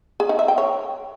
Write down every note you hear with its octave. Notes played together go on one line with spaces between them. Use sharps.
G#4
D#4
E5
G5
C#5